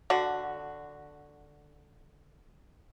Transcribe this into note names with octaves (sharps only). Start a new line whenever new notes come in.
D3 F#4